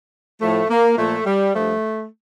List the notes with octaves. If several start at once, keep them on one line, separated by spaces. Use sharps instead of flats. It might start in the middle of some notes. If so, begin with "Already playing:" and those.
A2 F3 A3
A#3
A#2 F3 A3
G3
G2 F3 A3